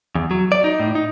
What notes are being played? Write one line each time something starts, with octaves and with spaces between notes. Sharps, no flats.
E2
F#3
D5
D#4
A2
D#4